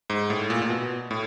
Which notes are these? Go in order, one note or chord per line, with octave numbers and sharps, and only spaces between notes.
G#2
A2
A#2
A#2
B2
A2